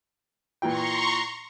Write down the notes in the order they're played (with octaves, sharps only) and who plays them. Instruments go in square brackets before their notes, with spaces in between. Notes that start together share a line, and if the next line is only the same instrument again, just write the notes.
[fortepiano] A#2 E3 G5 [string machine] A#5 C6 C#6